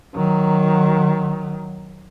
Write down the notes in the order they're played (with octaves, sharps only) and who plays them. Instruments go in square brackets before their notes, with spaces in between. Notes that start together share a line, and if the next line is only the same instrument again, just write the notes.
[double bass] D#3 F#3